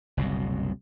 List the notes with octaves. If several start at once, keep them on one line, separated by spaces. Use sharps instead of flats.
F#1 C2 B2